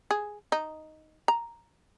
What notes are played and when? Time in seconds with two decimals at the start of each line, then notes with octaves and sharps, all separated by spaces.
0.11 G#4
0.52 D#4
1.28 A#5